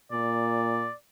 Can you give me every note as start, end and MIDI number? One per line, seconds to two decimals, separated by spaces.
0.12 0.87 46
0.12 0.93 74